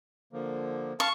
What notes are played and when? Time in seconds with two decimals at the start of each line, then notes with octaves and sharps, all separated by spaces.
0.33 D3 F3 A#3
1.00 F5 A5 C#6